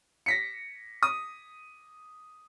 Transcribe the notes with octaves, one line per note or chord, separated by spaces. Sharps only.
A#6 B6 C#7
D#6